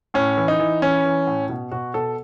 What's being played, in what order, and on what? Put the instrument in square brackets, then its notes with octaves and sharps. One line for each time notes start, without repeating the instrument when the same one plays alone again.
[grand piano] A2 C#4
E3
D#4
E3
E3 C#4
E3
A2
B2
B2 F#4
B2 A4